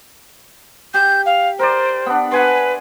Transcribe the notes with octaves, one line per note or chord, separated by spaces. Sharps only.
G4 G6
F5
A#4 C5 D5
B3 D4
B4 F#5 G#5 C6